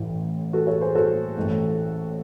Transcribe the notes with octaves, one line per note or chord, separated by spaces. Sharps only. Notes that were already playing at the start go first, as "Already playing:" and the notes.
Already playing: A1 A2 E3
F#4 A4
A4 C#5
G#4 C5
F#4 A4
A1 A2 E3